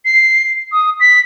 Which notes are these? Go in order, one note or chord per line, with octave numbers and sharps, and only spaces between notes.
C7
D#6
B6